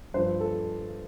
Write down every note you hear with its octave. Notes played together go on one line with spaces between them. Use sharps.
G2 F3 C5
A4